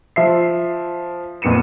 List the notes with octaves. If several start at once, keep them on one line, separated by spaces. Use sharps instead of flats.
F3 E5 C7
F2 A#2 B3 C#7 D#7 E7